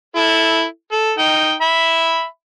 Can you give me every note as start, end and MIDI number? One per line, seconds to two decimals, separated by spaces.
0.16 0.64 64
0.16 0.64 69
0.92 1.12 69
1.19 1.53 63
1.19 1.53 79
1.62 2.25 76
1.62 2.25 83